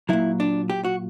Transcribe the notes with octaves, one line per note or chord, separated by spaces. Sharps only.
A#2 F#3 E4
D4
G4
F#4